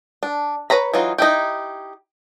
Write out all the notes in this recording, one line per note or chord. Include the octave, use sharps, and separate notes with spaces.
D4
B4 C#5 A#5 B5
E3 F#3 D#4 F4
D#4 E4 G4